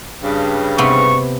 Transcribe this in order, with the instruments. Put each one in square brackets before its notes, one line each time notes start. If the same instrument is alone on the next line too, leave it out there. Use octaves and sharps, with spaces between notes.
[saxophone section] G2 C#3
[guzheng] C3 B3 [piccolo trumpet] C#6